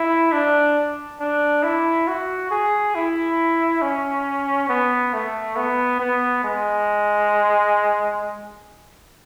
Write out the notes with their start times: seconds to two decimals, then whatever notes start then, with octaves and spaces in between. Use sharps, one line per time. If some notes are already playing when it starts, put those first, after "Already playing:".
Already playing: E4
0.32 D4
1.20 D4
1.63 E4
2.07 F#4
2.51 G#4
2.95 E4
3.82 C#4
4.69 B3
5.13 A3
5.56 B3
6.00 B3
6.44 G#3